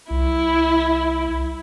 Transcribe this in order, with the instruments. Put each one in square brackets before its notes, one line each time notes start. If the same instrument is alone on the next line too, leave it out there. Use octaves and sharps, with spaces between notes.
[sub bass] C2 [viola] E4